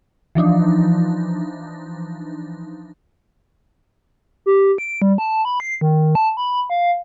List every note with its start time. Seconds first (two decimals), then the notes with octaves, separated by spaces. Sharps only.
0.35 E3 F3 D4 D#4
4.46 G4
4.78 D7
5.02 G3
5.18 A5
5.45 B5
5.60 C7
5.81 D#3
6.15 A5
6.37 B5
6.70 F5